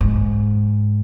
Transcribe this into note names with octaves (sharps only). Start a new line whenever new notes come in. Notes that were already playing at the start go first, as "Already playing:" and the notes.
G#2